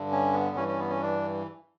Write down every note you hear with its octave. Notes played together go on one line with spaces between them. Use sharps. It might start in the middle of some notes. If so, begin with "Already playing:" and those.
Already playing: G2 D3
C#4
B3
G2 E3 C#4
C#4
B3
C#4
D4